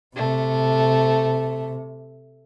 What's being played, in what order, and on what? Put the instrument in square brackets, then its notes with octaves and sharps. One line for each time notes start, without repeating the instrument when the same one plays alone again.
[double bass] C3 [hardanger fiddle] A3